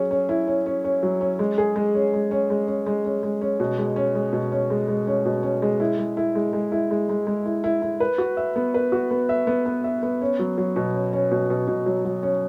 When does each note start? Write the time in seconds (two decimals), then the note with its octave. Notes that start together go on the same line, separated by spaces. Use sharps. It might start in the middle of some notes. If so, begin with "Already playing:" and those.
Already playing: F#3 C#4 G#4
0.11 C#4
0.29 E4
0.47 C#4
0.66 C#4
0.84 C#4
1.03 F#3
1.21 C#4
1.39 G#3
1.58 G#4
1.76 G#3
1.95 C#4
2.13 G#3
2.31 C#4
2.50 G#3
2.67 C#4
2.86 G#3
3.05 C#4
3.23 G#3
3.41 C#4
3.60 B2
3.78 G#3
3.96 C#4
4.15 G#3
4.33 B2
4.52 C#4
4.70 G#3
4.88 G#3
5.07 C#4
5.25 B2
5.43 C#4
5.62 G#3
5.80 E4
5.99 G#3
6.17 E4
6.35 G#3
6.53 G#3
6.72 E4
6.91 G#3
7.09 G#3
7.27 G#3
7.45 E4
7.64 E4
7.82 E4
8.00 B4
8.18 F#4
8.37 E5
8.56 B3
8.74 B4
8.92 F#4
9.11 B3
9.29 E5
9.47 B3
9.66 B3
9.84 E5
10.03 B3
10.21 C#4
10.39 F#3
10.58 F#3
10.76 B2
10.94 C#4
11.13 C#4
11.31 B2
11.50 B2
11.68 B2
11.86 F#3
12.05 F#3
12.23 C#4